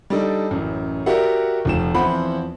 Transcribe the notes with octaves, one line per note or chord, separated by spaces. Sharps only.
G3 D4 D#4 A4
A1 F#2
F#4 G4 A#4 D5 E5 F#5
F1 F3 E7
E2 F3 C4 E4 F#5 B5